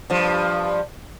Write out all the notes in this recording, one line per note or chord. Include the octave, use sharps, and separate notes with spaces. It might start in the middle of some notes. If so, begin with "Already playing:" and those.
G2 F3